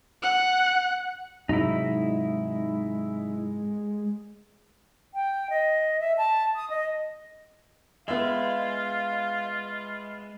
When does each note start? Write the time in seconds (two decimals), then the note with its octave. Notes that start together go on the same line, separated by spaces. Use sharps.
0.22 F#5
1.49 G#2 C3 F#3 G#3 D#4 E4
5.14 G5
5.50 D#5
6.00 E5
6.17 A5
6.56 D#6
6.70 D#5
8.08 G#3 B3 F4 E5 F5